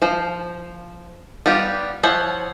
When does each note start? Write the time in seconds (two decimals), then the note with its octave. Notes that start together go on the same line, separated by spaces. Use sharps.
0.02 F3 C5
1.46 G3 B3 F4 G4
2.03 F3 E4 C5 C#5 F#5